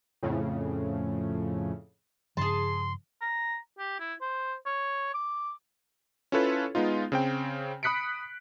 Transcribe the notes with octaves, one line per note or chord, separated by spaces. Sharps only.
F2 A2 C#3
G2 C#3 F3 G#4 A5 C6
A#5
G4
E4
C5
C#5
D6
C#4 E4 F4 A4 B4 C#5
G#3 B3 D#4 F4
C#3 C4 G5
B5 D#6 F#6 B6 C#7 D7